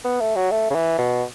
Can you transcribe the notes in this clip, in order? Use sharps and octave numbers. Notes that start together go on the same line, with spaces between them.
B3
A3
F#3
A3
C#3
E3
B2